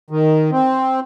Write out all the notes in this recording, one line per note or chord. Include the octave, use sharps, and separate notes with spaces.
D#3
C4